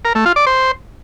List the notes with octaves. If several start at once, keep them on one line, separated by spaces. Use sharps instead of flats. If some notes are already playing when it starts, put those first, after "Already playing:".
A#4
A3
F4
D5
C5